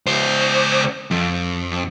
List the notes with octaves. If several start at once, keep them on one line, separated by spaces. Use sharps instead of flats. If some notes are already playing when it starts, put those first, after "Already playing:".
C#2 C5
F2